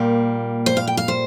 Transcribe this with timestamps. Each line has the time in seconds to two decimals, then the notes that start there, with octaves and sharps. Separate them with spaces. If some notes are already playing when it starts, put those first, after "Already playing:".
Already playing: A#2 G3 A#3
0.66 C5
0.77 F5
0.87 G5
0.97 F5
1.08 C5